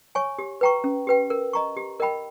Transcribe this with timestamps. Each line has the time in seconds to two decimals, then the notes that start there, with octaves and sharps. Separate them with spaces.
0.15 C#5 G#5 C#6
0.39 G4
0.61 B4 G5 A#5 C#6
0.84 C#4
1.07 G4 B4 G5
1.30 A#4
1.53 D#5 A#5 C#6
1.77 G4
2.00 A#4 D#5 G5 B5